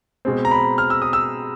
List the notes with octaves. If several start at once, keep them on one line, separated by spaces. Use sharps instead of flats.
B2 G#3 C4
A#5
B5
F6
E6
D#6
E6